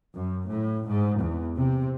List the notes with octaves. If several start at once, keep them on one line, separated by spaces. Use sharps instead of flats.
F#2
A2
G#2
E2
C3